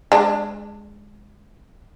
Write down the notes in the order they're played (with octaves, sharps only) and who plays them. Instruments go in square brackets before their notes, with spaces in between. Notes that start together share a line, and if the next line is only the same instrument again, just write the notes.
[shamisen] G#3 D4